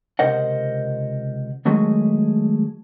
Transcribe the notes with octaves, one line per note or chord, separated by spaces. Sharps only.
C#2 C3 A#4 C5 D#5 F#5
D#3 F#3 G#3 A3 F#4 G#4